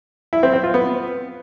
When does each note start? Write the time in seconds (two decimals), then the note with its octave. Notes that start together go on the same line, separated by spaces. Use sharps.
0.33 E4
0.43 C4
0.53 C4
0.64 F4
0.74 B3